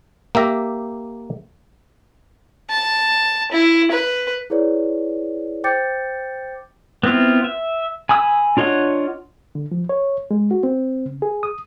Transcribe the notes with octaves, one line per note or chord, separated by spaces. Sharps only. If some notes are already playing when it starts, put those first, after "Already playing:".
A#3 G4 E5 A#5
A5
E4
B4
E4 G#4 B4 C#5 D5
C5 G5 D6 G6 A6 C#7
B3 C4 E4 F4
E5
G#5 B5 D#6 E6
D4 F4 C#5 D#5 F#5
D3
F3
C#5
G#3
F#4
C4
C#3
G#4
D#6